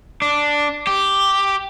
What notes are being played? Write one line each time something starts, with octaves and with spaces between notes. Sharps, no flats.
D4
G4